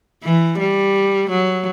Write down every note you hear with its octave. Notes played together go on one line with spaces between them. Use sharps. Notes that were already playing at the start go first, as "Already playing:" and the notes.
E3
G3
F#3